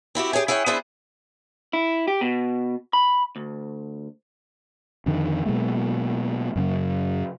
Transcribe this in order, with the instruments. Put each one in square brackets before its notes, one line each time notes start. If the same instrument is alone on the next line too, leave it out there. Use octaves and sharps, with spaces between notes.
[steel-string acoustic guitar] C4 E4 F#4 G4
G4 G#4 C#5 G#5
E4 G#4 C#5 F#5 G5
B3 D4 E4 G#4 C5 E5
[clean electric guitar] E4
G4
B2
B5
D2
[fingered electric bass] F2 D3 D#3
B2 F#3 G#3 A#3
F#2 C#3 F#3